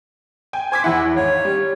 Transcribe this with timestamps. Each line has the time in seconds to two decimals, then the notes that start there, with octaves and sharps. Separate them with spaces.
0.53 G5 G#5
0.72 C5 G#5 D6 B6
0.84 E2 E4 F#5
1.16 G#1 C#5
1.45 G3